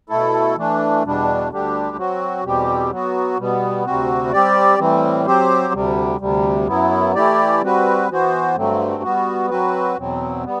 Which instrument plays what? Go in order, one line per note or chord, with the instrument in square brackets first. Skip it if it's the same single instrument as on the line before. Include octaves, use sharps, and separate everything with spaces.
[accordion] B2 A3 E4 A4
E3 A3 D4
E2 B2 G3 D4
D2 D3 G3 D4 G4
F#3 C4 F#4
E2 B2 G3 C4 G4
F#3 B3 F#4
B2 G3 B3
D2 C3 G3 C4 F#4
G3 C4 G4 D5
A2 E3 G3 C4
F#3 C4 G4 C5
D2 C3 G3
D2 C3 G3
F#2 F#3 B3 E4
E3 A3 E4 G4 D5
G3 C4 F#4 B4
E3 B3 F#4 C5
G2 D3 F#3 A3 C4
G3 B3 F#4
F#3 C4 F#4 B4
E2 B2 F#3 C4
G3 B3